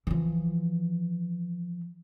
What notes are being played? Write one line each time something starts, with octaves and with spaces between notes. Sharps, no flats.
E3 F3